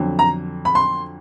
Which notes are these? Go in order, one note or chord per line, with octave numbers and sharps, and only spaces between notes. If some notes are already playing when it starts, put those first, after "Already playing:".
Already playing: F2 D3 F#3
A#5
B5
C6